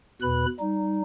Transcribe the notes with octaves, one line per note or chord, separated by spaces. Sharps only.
E2 B2 B4 B5
G3 D#4